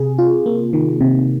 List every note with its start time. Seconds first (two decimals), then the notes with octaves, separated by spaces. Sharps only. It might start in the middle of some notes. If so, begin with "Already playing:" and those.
Already playing: C3 G#4
0.18 F4
0.46 A#3
0.73 D#3
1.01 C3